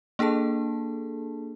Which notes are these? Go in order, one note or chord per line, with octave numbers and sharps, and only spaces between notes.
A#3 D4 G#4 A4 A5